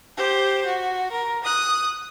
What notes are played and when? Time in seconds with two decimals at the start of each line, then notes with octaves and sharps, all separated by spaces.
0.17 G4 C5
0.65 F#4
1.12 A#4
1.44 D#6 F#6